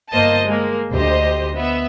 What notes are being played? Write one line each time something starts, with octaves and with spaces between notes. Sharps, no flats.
G1 A#3 C5 D#5 A5
G#3 A#3
D2 G4 C5 D#5
B3 E5